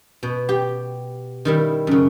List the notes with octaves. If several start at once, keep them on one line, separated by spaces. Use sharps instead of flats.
B2
G4
D#3 G3 E4
F#2 C#3